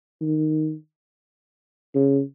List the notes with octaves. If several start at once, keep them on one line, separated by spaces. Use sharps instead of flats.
D#3
C#3